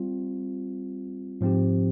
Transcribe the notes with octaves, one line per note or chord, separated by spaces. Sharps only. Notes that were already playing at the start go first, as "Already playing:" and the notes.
Already playing: G3 C4 F4
G#2 F3 C4 G4